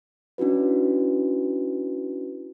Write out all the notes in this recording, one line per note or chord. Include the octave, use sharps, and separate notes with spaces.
C#4 D4 E4 F#4 B4